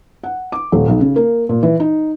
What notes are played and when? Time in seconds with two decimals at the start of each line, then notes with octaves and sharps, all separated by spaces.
0.24 F#5
0.52 D6
0.72 D#1
0.88 B1
1.01 C#3
1.16 A#3
1.49 A#2
1.63 E3
1.80 D#4